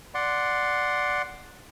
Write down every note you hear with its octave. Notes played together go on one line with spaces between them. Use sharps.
D5 F#5 C6